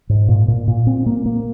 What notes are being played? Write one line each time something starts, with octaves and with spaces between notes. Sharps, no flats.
G#2
A#2
A#2
A#2
C4
A#3
A#3